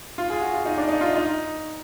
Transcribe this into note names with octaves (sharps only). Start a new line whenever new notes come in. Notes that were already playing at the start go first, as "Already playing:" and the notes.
F4
G#4
F#4
F4
D#4
D4
D#4
F4
D#4